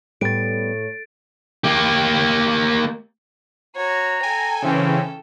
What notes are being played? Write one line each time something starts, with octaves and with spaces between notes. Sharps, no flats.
A2 G3 B3 A6 D7
A#3 G4
F#4 C#5 A#5
A4 G5 G#5
C#3 E3 C4 C#4